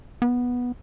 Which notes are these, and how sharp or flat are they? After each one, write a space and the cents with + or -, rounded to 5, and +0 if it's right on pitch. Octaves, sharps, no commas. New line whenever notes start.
B3 -10